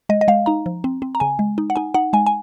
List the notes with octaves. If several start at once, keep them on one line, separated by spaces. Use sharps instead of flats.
G#3 D#5
D#5
G#3 F5
D#4 A#5
F3
C4
C4
A#5
C#3 G#5
G#3
D#4
F#5
D#4 G#5
D#4 F#5
G#3 G#5
G#5